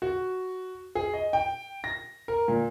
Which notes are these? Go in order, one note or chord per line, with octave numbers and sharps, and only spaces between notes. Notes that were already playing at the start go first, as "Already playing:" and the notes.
F#4
G#4
D#5
G5
A#6
A#4
A#2